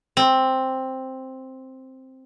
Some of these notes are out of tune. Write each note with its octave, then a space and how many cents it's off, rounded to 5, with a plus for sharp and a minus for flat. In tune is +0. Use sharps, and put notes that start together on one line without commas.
C4 +5